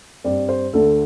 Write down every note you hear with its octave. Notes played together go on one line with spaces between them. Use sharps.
G2 G3 C4 D5
C5
D2 D3 A3 A4